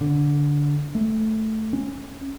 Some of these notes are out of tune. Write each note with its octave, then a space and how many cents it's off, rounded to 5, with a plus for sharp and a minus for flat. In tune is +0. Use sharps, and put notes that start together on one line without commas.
D3 -15
A3 -5
C#4 -20